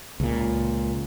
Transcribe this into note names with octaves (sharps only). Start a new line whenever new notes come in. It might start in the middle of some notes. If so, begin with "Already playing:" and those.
C#2 A#2